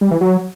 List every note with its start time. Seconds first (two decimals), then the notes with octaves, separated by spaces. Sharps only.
0.01 G3
0.11 E3
0.21 F#3